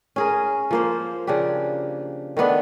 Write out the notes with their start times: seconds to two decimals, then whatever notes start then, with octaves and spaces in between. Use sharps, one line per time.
0.16 C#4 G#4 A#4
0.71 F3 A#3 C5
1.27 C#3 F3 D4 G4
2.37 D#3 A3 B3 D4